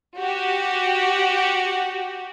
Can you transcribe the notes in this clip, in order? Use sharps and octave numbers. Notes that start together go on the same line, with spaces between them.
F#4 G4